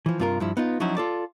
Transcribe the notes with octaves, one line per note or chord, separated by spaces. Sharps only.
E3 F3
G2 C3 F4 G#4 A#4
G2 F3 E4
B3 D#4 F4
F3 F#3 C#4 D#4 E4 F#4
F4 A4 D5